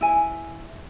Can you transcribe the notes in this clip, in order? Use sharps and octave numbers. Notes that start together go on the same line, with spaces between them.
E4 G#5